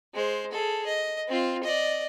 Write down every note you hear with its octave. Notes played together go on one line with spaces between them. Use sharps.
G#3 C5
G#4 A4
D#5
C4 F4
D5 D#5